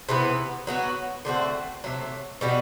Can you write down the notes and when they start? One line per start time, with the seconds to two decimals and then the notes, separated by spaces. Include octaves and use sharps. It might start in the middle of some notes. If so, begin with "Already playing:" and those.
0.09 C3 E3 B3
0.67 F#3 B3 F#4
1.25 D3 A3 C4 F#4
1.84 C3 F#3 A3
2.41 B2 G3 B3 F#4